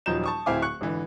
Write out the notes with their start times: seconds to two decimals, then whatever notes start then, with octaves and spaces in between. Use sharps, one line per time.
0.06 D#1 F3 F#3 D#4 G6 E7
0.24 A5 C#6 D#6
0.46 D1 C4 E4 F5 G#5 D6
0.62 C#6 F#6 C#7
0.81 G#1 D3 E3